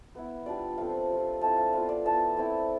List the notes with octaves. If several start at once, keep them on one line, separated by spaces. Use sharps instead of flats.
B3 E4
G3 D4 F4 D5
F3 A3 C4 F5
G3 D4 F4
A3 C4 E4 A5
F5
B3 F4 F5
D5
B3 E4 A5
A3 C4 E4